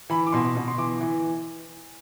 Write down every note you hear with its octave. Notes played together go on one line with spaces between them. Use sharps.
E3 B5
D6
B2 C6
B2
C6
E3 D6
E3